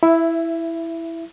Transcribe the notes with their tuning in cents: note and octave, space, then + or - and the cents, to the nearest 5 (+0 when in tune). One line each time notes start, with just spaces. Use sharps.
E4 +0 E5 +20